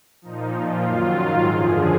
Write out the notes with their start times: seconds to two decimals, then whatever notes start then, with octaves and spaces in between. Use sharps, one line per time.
0.22 A#2 F3 D#4
0.53 A#2 F3 F4
0.84 F#2 D#3 F#3
1.15 G#2 D#3 F#3
1.45 F#2 D3 F3 G#4